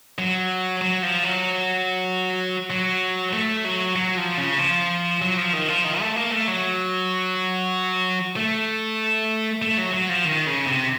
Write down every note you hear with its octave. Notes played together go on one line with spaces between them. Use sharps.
F#3
F#3
F3
F#3
F#3
A3
F#3
F#3
F3
C#3
F3
F#3
F3
D#3
F3
D#3
A3
A#3
A3
F#3
A3
A3
F#3
F#3
F3
D#3
C#3
C3